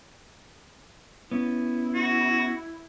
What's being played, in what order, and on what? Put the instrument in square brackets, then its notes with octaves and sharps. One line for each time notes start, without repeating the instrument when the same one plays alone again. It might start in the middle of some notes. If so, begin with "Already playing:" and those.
[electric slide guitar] B3 C#4 [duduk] E4
[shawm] F#4